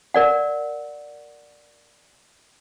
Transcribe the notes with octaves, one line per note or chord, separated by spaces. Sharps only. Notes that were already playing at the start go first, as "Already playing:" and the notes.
A#4 D5 F#5